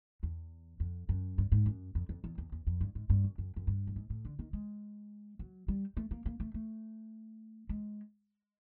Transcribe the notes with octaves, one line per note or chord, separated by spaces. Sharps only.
E2
F2
F#2
G2
G#2
F#2
F2
F2
E2
E2
E2
F2
G2
G#2
G2
F#2
F#2
F#2
G2
A2
G#2
A2
D3
D#3
G#3
F#3
G3
A3
A#3
A#3
A3
A3
G#3